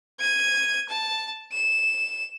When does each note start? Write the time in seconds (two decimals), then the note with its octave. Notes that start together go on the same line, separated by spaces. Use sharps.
0.20 G#6 D#7
0.89 A5
1.52 E7